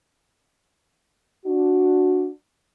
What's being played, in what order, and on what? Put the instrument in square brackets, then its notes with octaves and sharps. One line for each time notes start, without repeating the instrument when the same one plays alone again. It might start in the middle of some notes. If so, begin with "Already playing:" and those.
[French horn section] D4 F#4